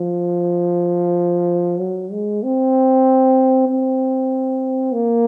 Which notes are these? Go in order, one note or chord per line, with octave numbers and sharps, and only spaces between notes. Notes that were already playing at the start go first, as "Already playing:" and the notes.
Already playing: F3
F#3
G#3
C4
C4
A#3